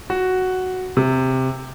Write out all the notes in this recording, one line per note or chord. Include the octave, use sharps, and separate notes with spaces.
F#4
C3